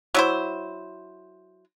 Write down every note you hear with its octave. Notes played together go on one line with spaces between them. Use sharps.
F#3 E4 C5